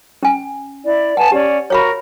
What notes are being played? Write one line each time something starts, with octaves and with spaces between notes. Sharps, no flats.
C#4 G#5
E4 D5
B4 F#5 G#5 A5
C#4 G4 D5
F#4 A#4 C#5 F5 A#5 B5